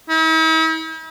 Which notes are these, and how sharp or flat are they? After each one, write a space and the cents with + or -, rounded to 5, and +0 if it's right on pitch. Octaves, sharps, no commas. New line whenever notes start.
E4 -45